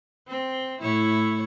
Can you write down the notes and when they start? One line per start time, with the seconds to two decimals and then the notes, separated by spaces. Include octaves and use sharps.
0.28 C4
0.81 A2 E4 C#5